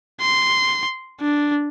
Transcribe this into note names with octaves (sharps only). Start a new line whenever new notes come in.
C6
D4